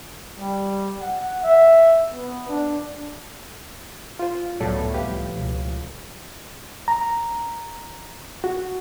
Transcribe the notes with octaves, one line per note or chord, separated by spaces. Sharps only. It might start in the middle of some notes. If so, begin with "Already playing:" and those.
G3
F#5
E5
B3
D4
F4 C5
F1 C#2 A2 F#3 B3 A4 D5
C2 F3 G4 B4 F5
C#2 B2 F3
A#5
F#4